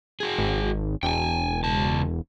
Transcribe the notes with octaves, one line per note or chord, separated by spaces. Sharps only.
F#4 G#4
G#1
E1 G5 G#5
C#2 A5